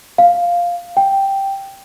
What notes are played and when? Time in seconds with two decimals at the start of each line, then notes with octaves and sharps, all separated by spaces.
0.18 F5
0.97 G5